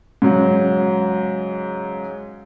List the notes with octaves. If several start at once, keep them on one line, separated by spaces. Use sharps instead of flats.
G#2 C#3 F#3